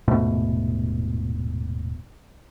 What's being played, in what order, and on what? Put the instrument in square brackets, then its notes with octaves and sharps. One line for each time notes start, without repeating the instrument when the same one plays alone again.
[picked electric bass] D#1 G#2 B2 A3